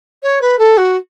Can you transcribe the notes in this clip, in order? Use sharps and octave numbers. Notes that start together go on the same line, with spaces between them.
C#5
B4
A4
F#4